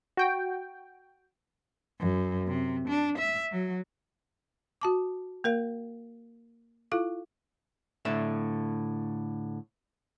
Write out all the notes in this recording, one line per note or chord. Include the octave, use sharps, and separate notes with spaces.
F#4 G5
F#2
C3
D4
E5
F#3
F#4 A5 D6
A#3 A#4 F5
E4 F4 A4 F5
A2 D3 E5